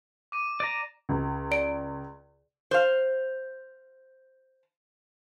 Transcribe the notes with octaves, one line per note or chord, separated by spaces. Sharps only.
D6 D#7
D5 A#5
C#2
D5 D7
C5 F5